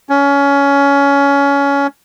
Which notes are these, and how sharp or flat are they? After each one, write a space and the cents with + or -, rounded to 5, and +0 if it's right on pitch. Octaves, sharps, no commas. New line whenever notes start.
C#4 +20